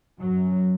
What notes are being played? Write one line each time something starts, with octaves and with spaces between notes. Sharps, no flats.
F#2 F#3